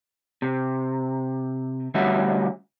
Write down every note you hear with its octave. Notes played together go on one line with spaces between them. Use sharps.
C3
D2 G3 C#4 F#4 E5